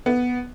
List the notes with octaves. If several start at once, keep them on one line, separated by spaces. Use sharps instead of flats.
B3